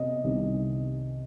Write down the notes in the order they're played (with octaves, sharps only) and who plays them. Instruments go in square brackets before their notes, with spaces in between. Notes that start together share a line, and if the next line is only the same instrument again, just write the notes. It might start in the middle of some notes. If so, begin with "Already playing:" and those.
Already playing: [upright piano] C3 D#5
C2 C3 D#3